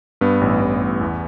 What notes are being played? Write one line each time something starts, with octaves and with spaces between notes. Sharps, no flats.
G2 B3
A1
A1
A1
E2